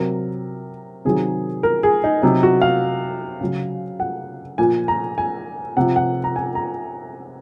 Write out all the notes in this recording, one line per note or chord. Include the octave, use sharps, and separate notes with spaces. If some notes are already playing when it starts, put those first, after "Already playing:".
Already playing: C3 F#3 A#4
C3 D#3 F#3 G#4
A#4
G#4
D#4
C3 F#3 D#4
F#4
F5
C#3 F#3
F#5
A#2 F3 G#5
A#5
G#5
C3 F3 F#5
F#5
A#5
G#5
A#5